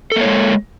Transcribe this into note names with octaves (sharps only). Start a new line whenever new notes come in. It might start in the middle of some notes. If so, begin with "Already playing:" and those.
G#3 A#3 A4 C#5